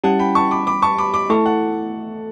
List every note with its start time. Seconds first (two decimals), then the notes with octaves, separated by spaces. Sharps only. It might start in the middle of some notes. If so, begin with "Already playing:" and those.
0.04 G3 C#4 E4 G4 F#5 A5
0.19 G5 B5
0.35 A5 C#6
0.51 B5 D6
0.67 B5 D6
0.82 A5 C#6
0.98 B5 D6
1.14 B5 D6
1.30 A3 E4 A4 A5 C#6
1.46 F#5 A5